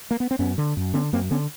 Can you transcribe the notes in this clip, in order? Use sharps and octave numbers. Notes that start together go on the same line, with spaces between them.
A#3
B3
C4
F#2 B3 C#4
D3
F#2
D3 B3 C#4
F#2 A#3 C4
D3 B3 C#4